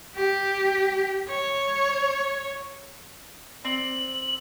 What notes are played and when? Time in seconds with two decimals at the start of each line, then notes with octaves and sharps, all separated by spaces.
0.15 G4
1.29 C#5
3.65 C4 D5 F#7